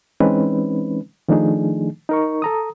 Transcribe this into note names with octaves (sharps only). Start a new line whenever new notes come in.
E3 G#3 C4 C#4 D#4 B4
D#3 F3 A3 D4 D#4 G#4
D#4 A#4 C#6
A4 A#5 D#6